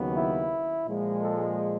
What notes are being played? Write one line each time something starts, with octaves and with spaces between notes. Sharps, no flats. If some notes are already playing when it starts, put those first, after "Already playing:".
Already playing: D#2 C#3 F#3 B3
E4
A#2 F3 G#3
A4